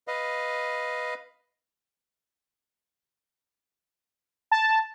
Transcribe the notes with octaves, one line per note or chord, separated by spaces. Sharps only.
B4 D#5 F5
A5